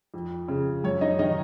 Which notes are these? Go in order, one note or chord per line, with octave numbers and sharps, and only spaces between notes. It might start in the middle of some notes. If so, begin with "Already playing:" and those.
F2
C#3
F#2 C#5
D#4 D#5
D#3 D#4 D#5